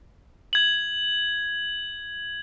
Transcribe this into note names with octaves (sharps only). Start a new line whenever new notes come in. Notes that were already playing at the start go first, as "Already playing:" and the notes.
G#6 F#7